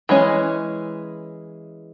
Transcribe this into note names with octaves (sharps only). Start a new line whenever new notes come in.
E3 G#3 C#4